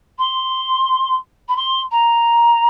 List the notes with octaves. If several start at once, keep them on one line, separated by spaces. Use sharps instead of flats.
C6
B5
C6
A#5